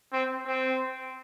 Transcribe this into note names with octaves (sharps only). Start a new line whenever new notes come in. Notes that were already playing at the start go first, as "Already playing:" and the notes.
C4
C4